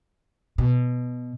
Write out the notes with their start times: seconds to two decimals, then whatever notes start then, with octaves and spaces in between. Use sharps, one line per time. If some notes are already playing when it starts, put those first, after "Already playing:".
0.58 B2